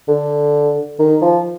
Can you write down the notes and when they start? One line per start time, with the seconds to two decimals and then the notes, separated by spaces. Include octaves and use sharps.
0.08 D3
0.99 D#3
1.22 F3